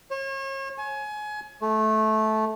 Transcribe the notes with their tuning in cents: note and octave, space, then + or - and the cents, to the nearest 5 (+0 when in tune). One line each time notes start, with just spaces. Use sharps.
C#5 -40
G#5 +25
A3 -15